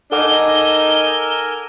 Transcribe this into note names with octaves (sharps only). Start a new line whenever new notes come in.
D#4 A4 A#4 F#5 G#5 D6 E6 G7